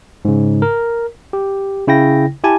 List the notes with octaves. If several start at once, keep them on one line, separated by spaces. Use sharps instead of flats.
G#2 C#3
A#4
G4
C#3 E4 G5 A#6
E4 G4 G#5 A5